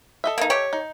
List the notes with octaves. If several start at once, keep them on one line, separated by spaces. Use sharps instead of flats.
A4 D#5 E5
A#3 D#4
G4 C#5
D#4